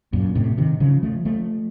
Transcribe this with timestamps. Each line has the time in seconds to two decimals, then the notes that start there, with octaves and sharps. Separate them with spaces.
0.13 F#2 A#2
0.35 A2 C3
0.58 C3 D#3
0.80 C#3 F3
1.03 F3 A3
1.25 F3 A3